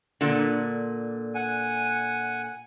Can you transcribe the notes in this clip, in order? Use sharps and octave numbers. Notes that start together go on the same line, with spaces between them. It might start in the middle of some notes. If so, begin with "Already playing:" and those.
A#2 D3
F#5 G#5